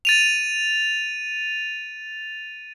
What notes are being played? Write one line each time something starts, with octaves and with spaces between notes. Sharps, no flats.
A6 D#7 F7